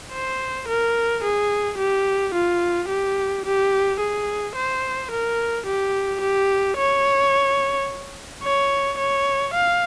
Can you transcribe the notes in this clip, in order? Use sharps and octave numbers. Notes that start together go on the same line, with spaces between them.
C5
A#4
G#4
G4
F4
G4
G4
G#4
C5
A#4
G4
G4
C#5
C#5
C#5
F5